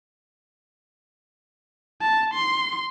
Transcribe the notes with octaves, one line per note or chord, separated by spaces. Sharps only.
A5
C6